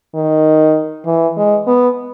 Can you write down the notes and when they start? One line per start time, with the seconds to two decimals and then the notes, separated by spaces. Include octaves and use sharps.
0.15 D#3
1.06 E3
1.37 G#3
1.67 B3